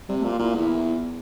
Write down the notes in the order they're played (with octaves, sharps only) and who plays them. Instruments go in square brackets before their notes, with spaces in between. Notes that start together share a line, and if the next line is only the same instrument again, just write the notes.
[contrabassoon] C3 [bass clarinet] G3
[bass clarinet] A3
[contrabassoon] A#2
[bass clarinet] F4
[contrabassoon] A#2 [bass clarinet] E4
[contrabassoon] E2 [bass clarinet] E4